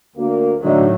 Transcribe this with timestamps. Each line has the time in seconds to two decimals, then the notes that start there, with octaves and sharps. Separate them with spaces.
0.17 D2 A#3
0.63 A2 D3 F#3 A3 D#4 F#4